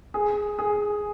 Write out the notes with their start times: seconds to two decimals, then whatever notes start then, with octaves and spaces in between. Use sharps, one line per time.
0.14 G#4
0.59 G#4